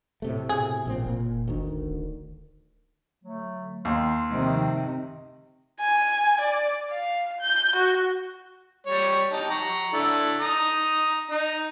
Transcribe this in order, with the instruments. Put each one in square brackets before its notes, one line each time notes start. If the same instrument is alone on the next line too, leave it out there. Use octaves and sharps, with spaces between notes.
[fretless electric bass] A2 C3 A3
[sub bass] B2 [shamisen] G#4
[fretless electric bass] A#1 A#2 C4
[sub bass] F#1 [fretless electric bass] A#2
[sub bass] G1 [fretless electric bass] D2 D#3
[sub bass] D1
[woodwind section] D3 F#3 A3
[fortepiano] D#2 [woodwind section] C6
[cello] C3 D#3 [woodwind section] F3 A3
[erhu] G#5
D5
F5
G6
F#4
[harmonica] G3 C#5
D#4 G4 A5
A#5 C#6
D4 E4 A4
A#5 D#6
D#4